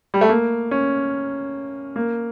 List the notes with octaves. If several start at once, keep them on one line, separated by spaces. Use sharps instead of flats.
G3
A3
A#3
C#4
A#3